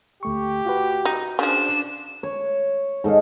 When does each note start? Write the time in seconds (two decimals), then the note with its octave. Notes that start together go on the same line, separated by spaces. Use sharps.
0.23 D2 A3 G4 C#6
0.66 F4 F#4 B4
1.05 D#4
1.39 C#3 F3 D4 E7
2.23 C#5
3.04 G#2 A4 D#5 F5